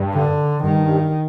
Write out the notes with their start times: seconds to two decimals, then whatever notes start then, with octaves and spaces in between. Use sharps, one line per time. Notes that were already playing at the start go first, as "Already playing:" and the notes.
Already playing: G2
0.14 D3
0.63 G2 D#3